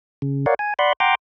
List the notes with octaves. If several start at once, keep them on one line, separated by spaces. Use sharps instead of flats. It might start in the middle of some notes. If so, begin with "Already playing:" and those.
C#3
A#4 C#5 D5 F5 F#5
G#5
D5 F#5 B5 C6
F#5 G5 A#5 C6 D6